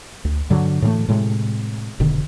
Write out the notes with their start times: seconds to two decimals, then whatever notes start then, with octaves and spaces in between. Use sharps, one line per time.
0.25 D2
0.50 G2 D3 F#3
0.82 A2 E3 G#3 A3
1.08 A2 C3 G#3
2.00 F1 B2 D3 D#3